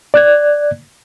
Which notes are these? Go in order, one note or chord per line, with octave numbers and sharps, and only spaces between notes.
D5 F#6 G#6